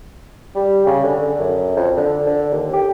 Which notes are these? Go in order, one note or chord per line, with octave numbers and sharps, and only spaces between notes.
G3
C#3
D3
D3
F#2
F2
D3
D3
D#2
G4